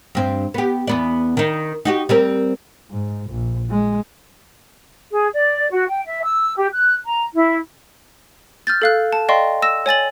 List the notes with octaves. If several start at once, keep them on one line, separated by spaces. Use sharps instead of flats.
G2 C4
B3 G4
E2 B3 D5
D#3 D#4
D#4 F#4 G4
G3 C4 A#4
G#2
A#1
G#3
G#4
D5
F#4
G5
E5
E6
G4
F#6
A#5
E4
F6 G6 A6
A4 F5 F#6
A5
D5 D#5 F5 G5 C6 C#6
E6 A#6 E7
C#5 G#5 A6 F#7